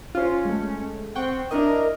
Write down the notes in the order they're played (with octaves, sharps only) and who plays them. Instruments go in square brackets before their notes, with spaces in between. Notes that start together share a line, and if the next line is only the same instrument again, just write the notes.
[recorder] C#4 [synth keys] F4 C5
[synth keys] G#3 A3
[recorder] C4 [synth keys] F#5 G5 C#6
[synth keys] D4 E4 D#5 [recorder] A#4